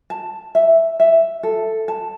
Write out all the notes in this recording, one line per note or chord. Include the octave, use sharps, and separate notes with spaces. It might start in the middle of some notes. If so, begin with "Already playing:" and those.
A5
E5
E5
A4
A5